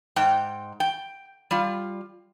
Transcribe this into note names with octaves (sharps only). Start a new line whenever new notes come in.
G#2 G5
G5
G3 F4